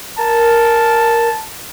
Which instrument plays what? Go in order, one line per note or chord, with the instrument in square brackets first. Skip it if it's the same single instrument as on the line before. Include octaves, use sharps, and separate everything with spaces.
[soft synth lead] A#4 [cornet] A5